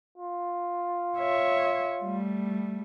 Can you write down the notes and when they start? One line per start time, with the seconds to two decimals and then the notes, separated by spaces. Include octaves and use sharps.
0.18 F4
1.18 C#5 E5
2.03 G3 A3